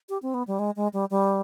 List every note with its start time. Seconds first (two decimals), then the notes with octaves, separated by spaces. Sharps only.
0.09 G4
0.22 C4
0.34 B3
0.47 G3
0.59 G#3
0.76 G#3
0.93 G3
1.10 G3